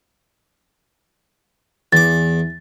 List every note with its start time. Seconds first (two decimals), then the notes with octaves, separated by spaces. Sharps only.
1.92 E2 E3 D6 A6